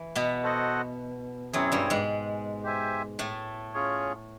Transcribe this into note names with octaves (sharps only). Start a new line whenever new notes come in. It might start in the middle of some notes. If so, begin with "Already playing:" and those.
Already playing: E3
B2 B3
F#4 A4 C5 D#5 F#5
F#2 F#3 C4 E4 G#4 C#5
G2 G3
G#2 G#3
G4 C5 E5 G#5
A2 A3
C#4 F4 G#4 C#5